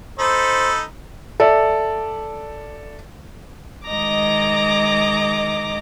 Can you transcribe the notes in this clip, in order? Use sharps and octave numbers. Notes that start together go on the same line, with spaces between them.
D#4 A4 C5 B5
A4 D5 E5
D#3 G#3 D#5 A#5 D6